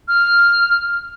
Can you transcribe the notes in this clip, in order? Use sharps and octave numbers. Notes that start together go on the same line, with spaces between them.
F6